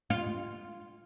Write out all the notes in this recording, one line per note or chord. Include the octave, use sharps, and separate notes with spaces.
F4